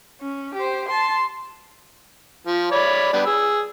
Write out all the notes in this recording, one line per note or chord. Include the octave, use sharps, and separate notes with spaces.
C#4
G4 C5
A5 C6
F3
C#5 D5 B5
G3 B3 D4
G#4 E6